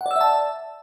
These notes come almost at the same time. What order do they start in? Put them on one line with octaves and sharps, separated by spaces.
F#5 D5 E6 E5 A5